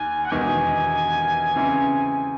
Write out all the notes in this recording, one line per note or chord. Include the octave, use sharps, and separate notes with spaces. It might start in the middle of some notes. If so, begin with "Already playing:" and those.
Already playing: D#2 G#5
F#5
E1 E2 D#3 G#5
C#3 E3 C4